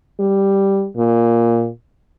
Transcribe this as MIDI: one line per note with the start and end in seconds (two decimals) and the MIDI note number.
0.20 0.87 55
0.97 1.69 46